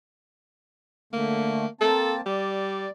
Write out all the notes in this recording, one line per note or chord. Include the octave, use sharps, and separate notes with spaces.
D3 A3 A#3
A#3 C4 A4 A5
G3 D5